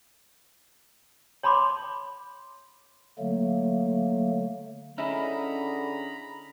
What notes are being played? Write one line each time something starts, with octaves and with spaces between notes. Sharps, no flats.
C#5 A5 B5 C6 D6
D3 F#3 A3 A#3
D3 C#4 D#4 E4 G#4 A#5 B5